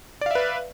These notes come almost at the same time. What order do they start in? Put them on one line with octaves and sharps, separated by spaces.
D5 F5 E5 B4